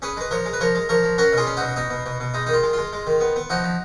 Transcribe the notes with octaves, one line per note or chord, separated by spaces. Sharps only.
C#4 G#4 B4
G#3 B4
F3 A#4 C#5
G#3
B4
F3 A#4 C#5
G#3
F3 A#4 C#5
F3
C#4 F#4 A#4
B2 F4 G#4
C#4
B2 D#4 F#4
B2 D#4
B2
B2
B2
G#3 D#4
D#3 D#4
F4
G#3
G#3 F4
G#3
D#3
B3
B3
F3 D#4 F#4
F3